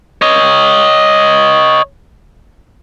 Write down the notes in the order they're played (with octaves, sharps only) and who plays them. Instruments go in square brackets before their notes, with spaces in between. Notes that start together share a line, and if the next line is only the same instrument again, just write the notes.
[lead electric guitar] C#5 D#5